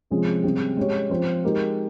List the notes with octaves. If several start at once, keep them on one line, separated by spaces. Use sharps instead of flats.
C3 F3 G#3 C#4 G#4
C3 G3 C#4 G#4
G#3 C#4 G4 C#5
F3 C4 F4 C5
G#3 D#4 G4 A#4